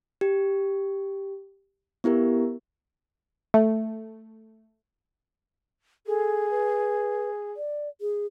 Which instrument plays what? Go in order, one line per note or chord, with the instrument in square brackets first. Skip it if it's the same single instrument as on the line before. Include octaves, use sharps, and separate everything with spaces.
[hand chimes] G4
B3 E4 G4 A#4
[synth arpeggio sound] A3
[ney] G#4 [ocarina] A4
[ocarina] B4
D5
G#4